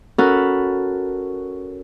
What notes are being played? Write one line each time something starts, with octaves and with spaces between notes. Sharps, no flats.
C#4 F#4 A4 A#4 F#5 B5